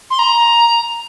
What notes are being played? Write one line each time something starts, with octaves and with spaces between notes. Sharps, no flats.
C6
A#5